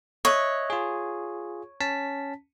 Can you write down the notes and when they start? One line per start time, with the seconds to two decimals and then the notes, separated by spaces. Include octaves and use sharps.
0.25 C#5 D#5 E5 F#6
0.70 F4 G#4
1.81 C#4 A5 B6